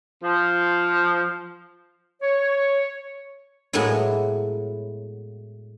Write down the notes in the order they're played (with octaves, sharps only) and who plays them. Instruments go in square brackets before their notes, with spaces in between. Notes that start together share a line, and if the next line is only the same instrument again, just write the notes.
[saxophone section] F3
[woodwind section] C#5
[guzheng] A2 F#3 G#3 A#3 B3 E4